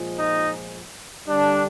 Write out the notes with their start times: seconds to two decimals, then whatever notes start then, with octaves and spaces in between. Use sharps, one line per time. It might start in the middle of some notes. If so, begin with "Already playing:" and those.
Already playing: A#2 F3 G#3
0.17 D#4
1.28 D3 G3 D4